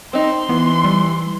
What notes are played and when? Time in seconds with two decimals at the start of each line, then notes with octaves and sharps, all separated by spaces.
0.13 C4 D#4 C6
0.49 E3 B3
0.84 G3